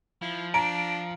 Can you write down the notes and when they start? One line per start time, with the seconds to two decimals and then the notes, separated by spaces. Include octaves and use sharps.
0.22 F3 E4
0.54 D4 A#5 D7